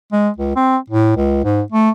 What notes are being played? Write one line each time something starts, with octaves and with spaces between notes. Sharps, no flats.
G#3
C#2
C4
A2
C#2
G#2
A3